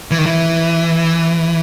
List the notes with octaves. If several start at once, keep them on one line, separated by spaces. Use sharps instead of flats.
E3
D#3
E3